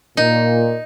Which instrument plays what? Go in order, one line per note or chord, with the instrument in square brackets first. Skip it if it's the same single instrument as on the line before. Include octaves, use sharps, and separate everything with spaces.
[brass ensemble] A#2 [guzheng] D#4